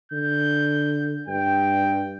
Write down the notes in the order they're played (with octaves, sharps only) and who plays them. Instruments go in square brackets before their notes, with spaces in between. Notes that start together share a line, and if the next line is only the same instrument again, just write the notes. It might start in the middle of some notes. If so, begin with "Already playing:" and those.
[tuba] D3 [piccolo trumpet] G6
[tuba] G2 [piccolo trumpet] G5